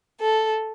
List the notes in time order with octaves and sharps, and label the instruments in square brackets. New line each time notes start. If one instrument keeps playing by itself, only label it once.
[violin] A4